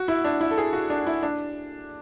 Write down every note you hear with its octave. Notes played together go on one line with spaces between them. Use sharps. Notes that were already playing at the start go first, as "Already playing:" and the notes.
Already playing: F#4
E4
D4
E4
A4
G#4
F#4
D4
E4
D4